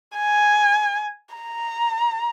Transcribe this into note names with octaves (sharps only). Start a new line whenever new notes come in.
G#5
A#5